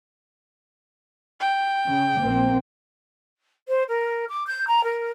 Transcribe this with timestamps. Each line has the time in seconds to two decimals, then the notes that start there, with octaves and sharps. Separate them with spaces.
1.40 G5
1.86 C#3
2.21 A#1 A#3 C4
3.68 C5
3.88 A#4
4.29 D6
4.47 G6
4.67 A#5
4.84 A#4